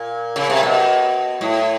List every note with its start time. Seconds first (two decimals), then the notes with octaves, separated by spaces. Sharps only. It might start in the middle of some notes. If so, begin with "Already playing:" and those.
Already playing: A#2
0.36 C#3
0.50 C3
0.63 B2
1.41 A2